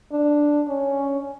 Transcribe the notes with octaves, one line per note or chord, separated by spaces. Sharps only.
D4
C#4